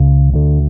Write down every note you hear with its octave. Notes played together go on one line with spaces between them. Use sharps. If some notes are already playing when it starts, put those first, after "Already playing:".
Already playing: C#2 C#3
D2 D3